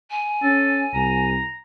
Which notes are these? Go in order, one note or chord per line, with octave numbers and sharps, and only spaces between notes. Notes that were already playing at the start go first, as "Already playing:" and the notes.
G#5
C#4 A4
C2 A#5